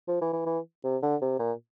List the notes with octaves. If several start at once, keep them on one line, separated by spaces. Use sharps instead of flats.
F3
E3
E3
E3
C3
D3
C3
A#2